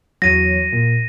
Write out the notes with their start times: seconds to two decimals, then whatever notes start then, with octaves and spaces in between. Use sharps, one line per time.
0.22 E2 F#3 A#6 D#7
0.73 A#2